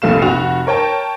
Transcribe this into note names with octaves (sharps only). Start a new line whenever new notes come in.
F1 A#1 A3 F5 E7
F1 F#4 F7
A#4 C#5 G5 A5